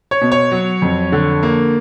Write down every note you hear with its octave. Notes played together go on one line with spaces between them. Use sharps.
C#5
B2
C#5
F#3
F2
D3
A#3